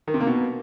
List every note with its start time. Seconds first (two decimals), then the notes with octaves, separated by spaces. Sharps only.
0.08 D#3
0.14 C3
0.20 A#3
0.27 B2